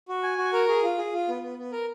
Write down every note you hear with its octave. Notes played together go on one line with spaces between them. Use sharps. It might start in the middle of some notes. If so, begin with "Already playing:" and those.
F#4
G#5
F#4
A#4
G#4
F4
G#4
F4
B3
B3
B3
A#4